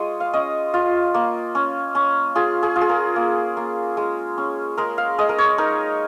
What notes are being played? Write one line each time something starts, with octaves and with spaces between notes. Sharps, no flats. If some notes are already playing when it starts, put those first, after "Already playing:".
Already playing: G#3 F4 C#5 D#5
F5
C#4 D#5
F4
A#3
C#4
C#4
F4 G#4
G#4
F4
G#4
A#4
A#3
A#3
G#3
C#4
G#3 A#4
F5
G#3 D#5
A#4
C#5
D#4 A#4